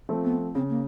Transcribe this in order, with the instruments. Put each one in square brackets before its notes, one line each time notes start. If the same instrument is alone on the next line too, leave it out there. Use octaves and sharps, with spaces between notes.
[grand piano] F3 A3 C4
[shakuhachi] B3
[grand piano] C#3 [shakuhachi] C4
[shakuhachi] A#3